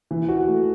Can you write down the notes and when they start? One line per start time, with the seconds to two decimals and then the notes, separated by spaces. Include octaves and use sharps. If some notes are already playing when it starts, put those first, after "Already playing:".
0.11 E3
0.28 F#4
0.47 A3